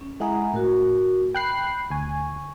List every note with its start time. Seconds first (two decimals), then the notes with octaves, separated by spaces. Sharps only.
0.01 C#4
0.20 G#3 E4 G#4 F#5 A#5
0.53 A2 F#4 A#4
1.35 G5 B5 F#6 C7
1.90 D2 G#5 C#6